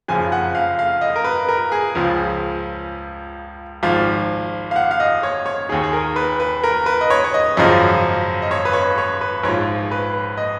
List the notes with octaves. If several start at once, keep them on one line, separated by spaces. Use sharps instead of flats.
F#1 F2 C#3 F3 G#5
F#5
F5
F5
D#5
A#4
B4
A#4
G#4
C#2 C#3 F3
G#1 G#2 F3 F5
F5
F#5
F5
D#5
C#5
C#5
D#2 D#3 G#4
G#4
A#4
B4
B4
A#4
B4
D#5
C#5
C#5
D#5
G#1 F#2 C#3 F3 D#5
D#5
C#5
B4
C#5
C#5
B4
A#1 G#2 F3 C#5
B4
D#5